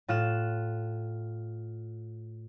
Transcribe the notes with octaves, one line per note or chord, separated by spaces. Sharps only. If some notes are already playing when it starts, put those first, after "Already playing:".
A2 F4 F#6 E7